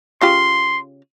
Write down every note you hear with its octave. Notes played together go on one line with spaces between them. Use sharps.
C#3 F4 G4 C6